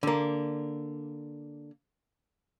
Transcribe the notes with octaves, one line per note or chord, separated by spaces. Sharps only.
D3 A#3